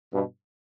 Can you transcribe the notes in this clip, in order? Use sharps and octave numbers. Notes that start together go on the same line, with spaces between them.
G2 B2